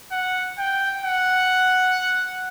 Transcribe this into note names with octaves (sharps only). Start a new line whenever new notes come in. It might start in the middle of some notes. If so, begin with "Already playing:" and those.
F#5
G5
F#5